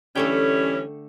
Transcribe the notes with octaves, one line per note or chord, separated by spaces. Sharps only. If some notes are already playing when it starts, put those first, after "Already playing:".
D3 E3 G3 A3 C#4 G5